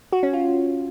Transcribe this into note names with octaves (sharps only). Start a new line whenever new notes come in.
F#4
C#4
F4